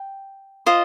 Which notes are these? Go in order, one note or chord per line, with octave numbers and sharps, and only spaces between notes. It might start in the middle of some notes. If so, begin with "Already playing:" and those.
Already playing: G5
F4 C5 D#5